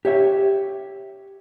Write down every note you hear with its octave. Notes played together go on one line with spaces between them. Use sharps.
G4 C#5 E5